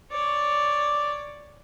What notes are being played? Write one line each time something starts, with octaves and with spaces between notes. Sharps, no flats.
C#5 D5